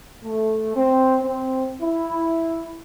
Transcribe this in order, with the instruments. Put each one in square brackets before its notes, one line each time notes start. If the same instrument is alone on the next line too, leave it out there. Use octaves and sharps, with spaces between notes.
[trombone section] A3
C4
C4
E4